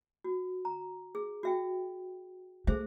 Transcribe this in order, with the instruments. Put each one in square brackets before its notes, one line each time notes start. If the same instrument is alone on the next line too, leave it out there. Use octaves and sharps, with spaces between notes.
[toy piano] F#4
A#5
G#4
F#4 E5 G5
[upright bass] A3 [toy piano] G#4 C5 E5